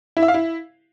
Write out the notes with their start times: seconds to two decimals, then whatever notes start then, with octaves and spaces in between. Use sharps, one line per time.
0.17 E4
0.22 E5
0.28 F5
0.34 E4